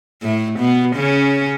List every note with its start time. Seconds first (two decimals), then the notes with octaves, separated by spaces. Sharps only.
0.22 A2 A3
0.59 B2 B3
0.96 C#3 C#4